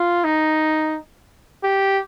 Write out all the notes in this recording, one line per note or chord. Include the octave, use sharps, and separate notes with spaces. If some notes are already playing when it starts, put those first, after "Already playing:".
Already playing: F4
D#4
G4